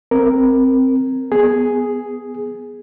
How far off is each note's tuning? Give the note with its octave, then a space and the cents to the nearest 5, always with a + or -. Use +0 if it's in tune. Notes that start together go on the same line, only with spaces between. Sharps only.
C4 +0 A#4 +0
B3 +0 G#4 +0